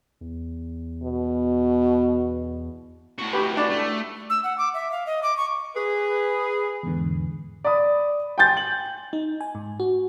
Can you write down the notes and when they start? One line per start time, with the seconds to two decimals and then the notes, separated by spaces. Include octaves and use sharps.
0.21 E2
1.02 B2
3.18 A2 F#4
3.33 G4 B4
3.57 D4
3.70 A3
4.30 E6
4.43 F#5
4.58 D6
4.74 E5
4.92 F5
5.06 D#5
5.23 D6
5.37 C#6
5.75 G#4 B4
6.83 E2 G#2 D3
7.64 D5 B5 D#6
8.38 G5 G#5 C6 G6 A6
8.57 F#7
9.13 D#4
9.41 G#5
9.55 G#2
9.80 F#4